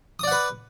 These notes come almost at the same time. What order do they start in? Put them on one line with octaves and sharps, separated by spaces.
D#6 D5 F#5 B4